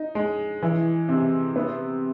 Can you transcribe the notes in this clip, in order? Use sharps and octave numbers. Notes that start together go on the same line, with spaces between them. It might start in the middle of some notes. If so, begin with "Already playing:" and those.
Already playing: D#4
G#3
E3
C3
B3